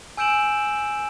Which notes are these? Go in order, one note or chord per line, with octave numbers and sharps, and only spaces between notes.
G#5 E6 G6 D7 E7 F#7